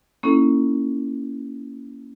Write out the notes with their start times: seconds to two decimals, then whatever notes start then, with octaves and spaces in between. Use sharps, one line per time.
0.23 A#3 C#4 D#4 E4 A4